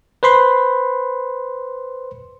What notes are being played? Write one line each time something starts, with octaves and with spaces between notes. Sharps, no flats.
B4 C5 B5 C6